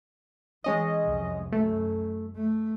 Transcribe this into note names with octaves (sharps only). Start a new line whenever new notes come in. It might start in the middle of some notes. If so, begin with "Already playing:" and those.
E3 G#3 C#4 D#5
C2 F2
F#2 A3
A3